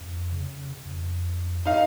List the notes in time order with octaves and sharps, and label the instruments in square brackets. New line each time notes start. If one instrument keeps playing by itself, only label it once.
[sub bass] F2
C#3
F2
[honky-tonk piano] D#4 F5